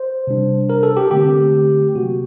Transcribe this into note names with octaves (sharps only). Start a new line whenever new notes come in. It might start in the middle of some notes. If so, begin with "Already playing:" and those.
Already playing: C5
C3 G3 D4
A#4
A4
G4
D3 A3 C4 G4
C3 F#3 A#3 F#4